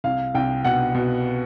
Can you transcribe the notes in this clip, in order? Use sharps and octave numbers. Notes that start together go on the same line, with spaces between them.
C2 F5
C2 G5
B2 F#5
B2